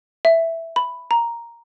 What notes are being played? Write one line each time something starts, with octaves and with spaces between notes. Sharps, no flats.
E5
B5
A#5